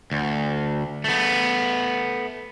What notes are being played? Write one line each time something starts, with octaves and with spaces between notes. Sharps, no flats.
D2
A3 B3